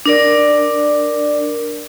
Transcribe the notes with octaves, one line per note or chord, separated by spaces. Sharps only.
D4 A#4 D5